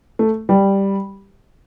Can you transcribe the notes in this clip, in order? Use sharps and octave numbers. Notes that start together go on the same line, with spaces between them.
A3
G3